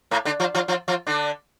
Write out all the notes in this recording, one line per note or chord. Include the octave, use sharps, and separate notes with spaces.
A2 A3
D3 D4
F3 F4
F3 F4
F3 F4
F3 F4
D3 D4